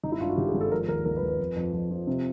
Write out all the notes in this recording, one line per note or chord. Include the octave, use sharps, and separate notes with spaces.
G#1 D#4
E4
G2 F4
F#4
G#1 G4
G#4
G#1
A4
F3 A#4
D#2 A#4
D#2 A#4
B4
D#2
B4
F2
F2
F2
F3
C3